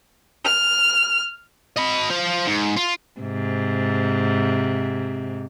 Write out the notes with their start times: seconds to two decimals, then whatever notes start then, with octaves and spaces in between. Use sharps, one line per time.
0.43 F6
1.77 D#5 B5
2.10 F4 C5
2.47 G#2
2.77 F4
3.20 G#2 C3